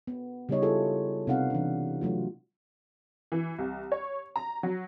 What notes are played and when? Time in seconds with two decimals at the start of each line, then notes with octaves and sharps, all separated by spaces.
0.07 B3
0.49 C#3 G3 B3 D#4 C#5 D#5
0.62 E4 F4 G#4 A4
1.27 C3 B3 D#4 F5 F#5
1.50 E3 D4
2.01 F#3 A3 F4
3.32 E3
3.59 C2
3.92 C#5
4.36 A#5
4.63 F#3